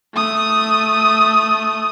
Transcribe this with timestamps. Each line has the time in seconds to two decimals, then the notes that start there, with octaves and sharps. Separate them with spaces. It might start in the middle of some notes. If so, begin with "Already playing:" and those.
0.15 A3 D#6